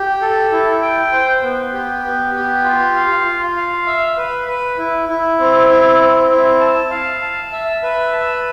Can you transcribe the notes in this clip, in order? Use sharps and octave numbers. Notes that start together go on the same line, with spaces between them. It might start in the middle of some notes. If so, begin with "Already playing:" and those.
Already playing: G4
A4
E4
G5
C5
B3
G4
B3
G4
F4
F5
F4
F5
E5
B4
B4
E4
E4
C4
E4
C4
E4
A5
F5
A5
E5
B4
A5